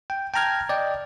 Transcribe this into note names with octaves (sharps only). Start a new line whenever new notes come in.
G5
G5 A5 A#5 F6 G#6
D5 D#5 G5